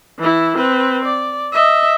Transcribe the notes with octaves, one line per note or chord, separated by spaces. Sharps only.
E3 E4
C4 B4
D5
D#5 E5